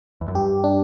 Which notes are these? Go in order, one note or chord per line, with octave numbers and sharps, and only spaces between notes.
E2
F#2
G2 G4
D4